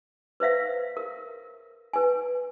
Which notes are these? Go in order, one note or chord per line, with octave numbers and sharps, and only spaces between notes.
B4 C5 E5 F5
A#4
B4 G#5